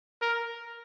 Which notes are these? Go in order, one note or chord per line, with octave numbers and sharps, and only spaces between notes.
A#4